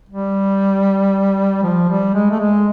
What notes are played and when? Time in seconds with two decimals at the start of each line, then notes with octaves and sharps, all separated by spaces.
0.09 G3
1.63 F3
1.89 G3
2.15 G#3
2.31 A3
2.40 G#3